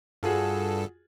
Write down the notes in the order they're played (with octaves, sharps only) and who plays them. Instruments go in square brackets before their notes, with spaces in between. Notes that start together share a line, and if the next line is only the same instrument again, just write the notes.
[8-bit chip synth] G2 A4 [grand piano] F4 F#4 G#4